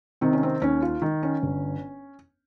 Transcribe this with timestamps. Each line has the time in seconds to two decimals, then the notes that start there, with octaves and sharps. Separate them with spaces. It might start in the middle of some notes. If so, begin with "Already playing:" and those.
0.21 C3 D#3 C4
0.33 C#4
0.43 C4
0.62 D#2 C#4
0.82 F4
1.02 D#3
1.23 C#4
1.43 G1